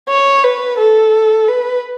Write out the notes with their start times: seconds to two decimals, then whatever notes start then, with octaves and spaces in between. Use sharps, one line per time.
0.09 C#5
0.44 B4
0.78 A4
1.48 B4